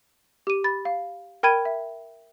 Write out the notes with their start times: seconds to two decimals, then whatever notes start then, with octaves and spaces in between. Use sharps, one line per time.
0.47 G4 D#7
0.64 B5 A6
0.85 F5
1.43 A#4 G5 B5 G#6 D#7
1.65 E5